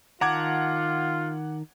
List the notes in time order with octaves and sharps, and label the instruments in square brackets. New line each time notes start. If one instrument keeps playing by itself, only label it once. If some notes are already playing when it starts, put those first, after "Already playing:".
[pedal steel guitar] D#3 A5 A#5 [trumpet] F4 [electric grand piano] F#5 D6 G#6